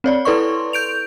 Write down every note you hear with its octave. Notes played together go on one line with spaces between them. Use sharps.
C4 C#5 D5
E4 A4 B4 D5 C6 C#6
G6 D7 F7